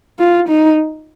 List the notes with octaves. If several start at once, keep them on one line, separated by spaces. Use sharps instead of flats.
F4
D#4